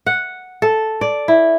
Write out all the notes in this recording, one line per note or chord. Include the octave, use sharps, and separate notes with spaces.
F#5
A4
D5
E4